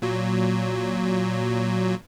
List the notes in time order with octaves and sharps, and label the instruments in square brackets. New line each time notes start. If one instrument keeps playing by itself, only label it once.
[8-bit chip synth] A#2 F#3